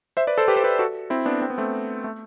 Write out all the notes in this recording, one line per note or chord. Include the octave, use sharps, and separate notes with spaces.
C5 E5
B4 D5
A4 C5
G4 B4
C5
G4 B4
F#4 A4
C4 E4
B3 D4
C4
B3
A3 C4
A3